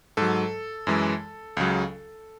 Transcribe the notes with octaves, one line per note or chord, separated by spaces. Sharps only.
G#2 F#3 A4
F#2 E3 G#3
C#2 C#3 F#3